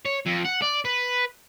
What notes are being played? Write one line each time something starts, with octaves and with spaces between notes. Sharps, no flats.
C#5
F2
F#5
D5
B4